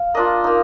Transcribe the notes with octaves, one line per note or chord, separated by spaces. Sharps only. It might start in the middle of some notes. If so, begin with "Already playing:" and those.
Already playing: F5
A#3 D4 F4 D#5
A#3 D#4